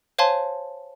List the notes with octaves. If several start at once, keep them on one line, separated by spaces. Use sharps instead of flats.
C5 C#5 F5 G#5 A5 C6